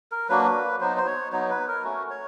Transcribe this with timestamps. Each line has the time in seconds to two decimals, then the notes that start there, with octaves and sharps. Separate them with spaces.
0.12 A#4
0.29 F#3 A#3 D4 F#4 B4
0.81 F#3 B3 D#4 C5
0.97 C5
1.07 C#5
1.32 F#3 B3 D#4 C#5
1.50 B4
1.68 A#4
1.85 A3 C#4 F#4
2.10 C#5